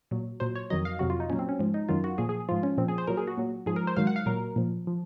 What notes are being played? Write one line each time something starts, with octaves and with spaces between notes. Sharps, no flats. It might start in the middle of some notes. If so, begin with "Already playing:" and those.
A#2 F#3
A#2 F#3 C5
C#5
F2 D#3 F#3 D#5
F5
F2 C3 F#3 F#4
F4
D#4
A#2 F#3 C#4
C4
C#4
G#2 F3
D#4
F#2 D#3 F#3 F4
F#4
A#2 F3 G#4
G#4
G#2 F3 F4
C#4
A#2 F3 C4
G#4
C5
A#2 F#3 A#4
G#4
F#4
A#2 F#3
G#2 F3 G#4
A#4
C5
G#2 D#3 F#3 F5
F#5
F5
A#2 F#3 A#4
A#2 F3
F3